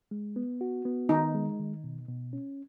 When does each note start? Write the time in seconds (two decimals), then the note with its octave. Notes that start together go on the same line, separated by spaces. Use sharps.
0.11 G#3
0.36 B3
0.61 F#4
0.85 B3
1.09 D#3 D#4
1.34 G#3
1.59 D#3
1.84 B2
2.08 B2
2.33 C#4